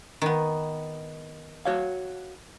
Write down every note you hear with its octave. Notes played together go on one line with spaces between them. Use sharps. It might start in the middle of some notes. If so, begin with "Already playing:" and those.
D#3 B3
F#4 C#5 F5